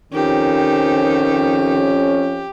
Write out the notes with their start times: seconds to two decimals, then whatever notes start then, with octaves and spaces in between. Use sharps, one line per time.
0.13 F2 D#3 F3 C#4 G4